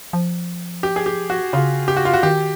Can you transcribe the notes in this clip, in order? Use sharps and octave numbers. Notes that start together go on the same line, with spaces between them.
F3
G4
G#4
G4
F#4
C#3 F4
G4
F#4
F4
F#4
D#3 G4